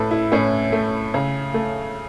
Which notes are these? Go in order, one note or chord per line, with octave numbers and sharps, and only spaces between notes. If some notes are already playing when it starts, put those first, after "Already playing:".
Already playing: A2 A4 B4
E4
A2 C#4
A3
C#3
A3